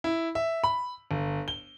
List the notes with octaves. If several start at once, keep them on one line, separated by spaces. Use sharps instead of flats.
E4
E5
B5
G1
G7